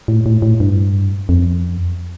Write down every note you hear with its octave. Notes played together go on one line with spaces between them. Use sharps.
A2
A2
A2
G2
F2